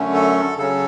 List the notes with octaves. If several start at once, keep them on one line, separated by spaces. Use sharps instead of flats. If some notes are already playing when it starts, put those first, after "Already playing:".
Already playing: F#2 D3 A3 C#4
A4
C#3 F#3 C#4 A4